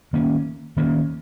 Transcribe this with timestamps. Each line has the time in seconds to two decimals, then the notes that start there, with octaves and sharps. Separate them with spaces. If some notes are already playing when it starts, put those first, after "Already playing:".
0.13 D#3 A#3 C#4
0.77 D#3 A#3 C#4